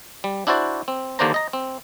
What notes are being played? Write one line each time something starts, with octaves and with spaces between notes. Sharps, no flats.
G3
D4 E4 F#4 C5 D5
C4
D#2 D3 A#3 D4 C5 A#5
D#5 A#5
C4